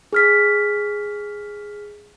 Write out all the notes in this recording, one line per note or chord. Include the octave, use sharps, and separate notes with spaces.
G#4 F6 B6